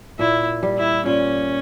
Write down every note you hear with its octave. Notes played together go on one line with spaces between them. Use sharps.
A#2 E4
G3
E4
A#2 C#4